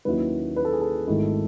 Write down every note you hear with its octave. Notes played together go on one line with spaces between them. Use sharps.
D#2 D#3 F#3 C#4 E4 B4
B4
A4
G#4
A4
G#1 G#2 D#3 A3 E4